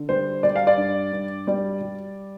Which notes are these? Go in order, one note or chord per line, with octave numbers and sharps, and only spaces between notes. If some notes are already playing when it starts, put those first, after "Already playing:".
Already playing: D3
G3 C5
G3 D5
F5
D5
G2
G2
G3 D5
G3